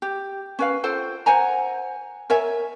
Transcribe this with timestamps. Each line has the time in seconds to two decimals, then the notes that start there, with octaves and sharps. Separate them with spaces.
0.02 G4
0.59 C#4 B4 F5
0.83 F4 A4 C5 G5
1.26 C5 F#5 G#5 A#5
2.30 A#4 C#5 E5 G#5